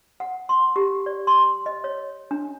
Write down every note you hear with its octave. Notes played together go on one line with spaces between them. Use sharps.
F#5
C6
G4
D5
C6
D#5
C#5
D4